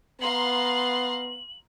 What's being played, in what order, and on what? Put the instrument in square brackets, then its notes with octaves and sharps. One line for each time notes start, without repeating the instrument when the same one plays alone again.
[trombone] B3 [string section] F5 A#5 C6 [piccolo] F#7